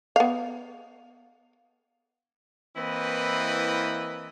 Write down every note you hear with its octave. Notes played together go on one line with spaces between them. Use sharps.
B3 F5
E3 A#3 C4 E4 B4 D#5